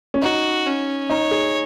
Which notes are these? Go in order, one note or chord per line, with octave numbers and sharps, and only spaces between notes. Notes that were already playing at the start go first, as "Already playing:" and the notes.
C#4
D#4 F#4
C#4
D#4 C#5
G#4